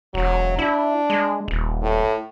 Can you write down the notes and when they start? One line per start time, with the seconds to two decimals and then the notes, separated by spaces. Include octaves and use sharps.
0.14 E1 F#3
0.59 D4 E4
1.10 G#3
1.48 D#1
1.82 A2